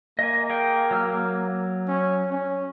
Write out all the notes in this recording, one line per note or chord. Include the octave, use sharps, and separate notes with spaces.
A#3 D#5 G#5
G#4 F5 G5
F#3 E6 F6
C#4
C#4